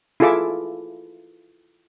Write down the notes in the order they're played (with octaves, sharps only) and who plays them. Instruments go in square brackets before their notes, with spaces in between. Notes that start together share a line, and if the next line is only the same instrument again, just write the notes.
[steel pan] E4 F4 G#4 A4 E5 D6